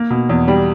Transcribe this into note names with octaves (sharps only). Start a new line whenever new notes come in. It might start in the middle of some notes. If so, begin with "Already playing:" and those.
Already playing: A#3
B2
E2
G3